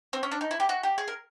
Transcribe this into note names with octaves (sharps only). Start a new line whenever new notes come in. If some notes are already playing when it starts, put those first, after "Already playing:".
C4
C#4
D4
D#4
E4
G4
F#4
G4
G#4
A#4